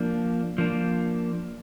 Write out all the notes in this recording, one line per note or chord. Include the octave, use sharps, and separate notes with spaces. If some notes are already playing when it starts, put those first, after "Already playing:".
Already playing: F3 A#3 D4
F3 A#3 D4